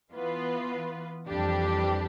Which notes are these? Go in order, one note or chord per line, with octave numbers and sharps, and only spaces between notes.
E3 B3 F4 B4
F2 E3 G3 D4 G4